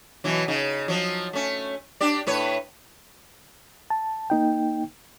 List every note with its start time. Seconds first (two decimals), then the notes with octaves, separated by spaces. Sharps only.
0.24 B2 E3 F#3
0.48 C#3 D#4
0.88 F3 F#3
1.33 A3 C#4
2.01 D4 G4 D5
2.27 A2 B4 C#5
3.90 A5
4.30 A#3 D#4 G5